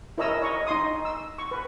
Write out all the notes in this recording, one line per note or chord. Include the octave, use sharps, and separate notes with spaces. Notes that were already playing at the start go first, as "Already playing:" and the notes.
E4 A#4 C#5 D#5 A#5 E6
C#5 D#5 C#6
D#4 D#5 C6 D#6
E6
C#6
B4